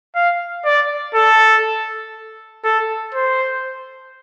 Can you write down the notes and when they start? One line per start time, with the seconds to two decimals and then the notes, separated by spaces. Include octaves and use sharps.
0.15 F5
0.65 D5
1.15 A4
2.64 A4
3.14 C5